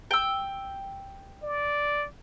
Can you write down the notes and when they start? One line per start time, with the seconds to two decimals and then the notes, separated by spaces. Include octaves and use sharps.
0.11 G5 E6
1.42 D5